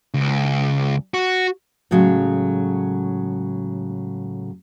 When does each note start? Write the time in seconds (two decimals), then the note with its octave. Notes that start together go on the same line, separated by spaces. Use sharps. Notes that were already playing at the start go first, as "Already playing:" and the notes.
0.14 C#2
1.14 F#4
1.91 A2 C#3 F#3 G#3